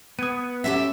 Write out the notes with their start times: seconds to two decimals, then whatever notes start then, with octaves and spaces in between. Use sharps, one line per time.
0.19 B3 D#6 G#6 D#7
0.64 F#2 G4 A4 E5 F#5 B6